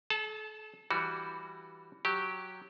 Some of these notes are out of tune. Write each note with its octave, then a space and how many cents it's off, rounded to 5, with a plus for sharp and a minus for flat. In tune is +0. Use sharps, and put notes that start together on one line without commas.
A4 -40 A5 +0
E3 +5 G3 +0 F#4 +0
F#3 +0 G4 -10